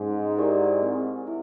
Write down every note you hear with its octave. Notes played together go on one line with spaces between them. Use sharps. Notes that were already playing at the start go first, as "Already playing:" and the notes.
Already playing: G#2 C#4
E4 G4 A#4 D5
C4
E4